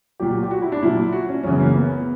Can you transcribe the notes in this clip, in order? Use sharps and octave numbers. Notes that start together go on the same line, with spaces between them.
A#2 F#3 G4
G4
F#4
E4
D4
A#2 F#3 E4
F#4
C#4
F#2 C#3 E3 C#4
B3
A#3
B3